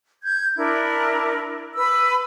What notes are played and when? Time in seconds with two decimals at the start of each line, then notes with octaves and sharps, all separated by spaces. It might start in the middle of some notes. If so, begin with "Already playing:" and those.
0.22 G6 G#6
0.57 D4 E4 A#4
1.76 B4 B5 E6